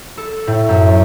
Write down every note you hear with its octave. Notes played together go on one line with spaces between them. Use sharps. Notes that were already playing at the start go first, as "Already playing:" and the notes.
A4
A2
F#2